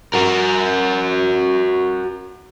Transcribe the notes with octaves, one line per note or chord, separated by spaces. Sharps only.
F#4 A#4